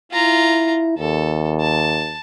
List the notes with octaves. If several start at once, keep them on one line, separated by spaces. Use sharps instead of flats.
E4 F4 A#5
D#2 A4
A5